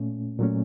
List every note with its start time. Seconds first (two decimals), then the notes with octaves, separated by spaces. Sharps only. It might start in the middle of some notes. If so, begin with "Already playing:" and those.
Already playing: A#2 A3 C#4
0.39 A#2 F#3 A3 C#4